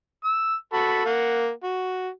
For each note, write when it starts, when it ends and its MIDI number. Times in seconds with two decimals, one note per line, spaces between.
0.24 0.54 88
0.73 1.04 66
0.73 1.04 69
0.73 1.04 83
1.06 1.49 58
1.06 1.49 78
1.64 2.08 66